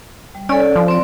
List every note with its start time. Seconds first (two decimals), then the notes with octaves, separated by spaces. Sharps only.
0.35 G3
0.49 C#4 A4 D5
0.76 F3
0.88 C4 D5 F5